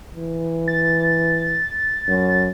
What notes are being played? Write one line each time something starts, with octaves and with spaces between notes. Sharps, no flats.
E3
A6
F#2